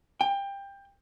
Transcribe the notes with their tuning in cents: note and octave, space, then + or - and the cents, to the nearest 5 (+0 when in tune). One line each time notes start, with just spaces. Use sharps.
G5 +20